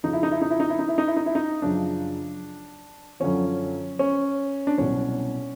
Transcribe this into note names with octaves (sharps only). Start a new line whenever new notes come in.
F2 C#3 F3 D#4
E4
D#4
E4
D#4
E4
D#4
E4
D#4
E4
D#4
E4
D#4
E4
D#4
F#2 C#3 F3 D4
F#2 D3 F3 C#4
C#4
D4
C2 B2 F#3 C#4